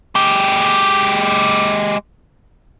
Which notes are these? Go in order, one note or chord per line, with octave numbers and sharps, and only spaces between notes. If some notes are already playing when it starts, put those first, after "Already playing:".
G#3 G4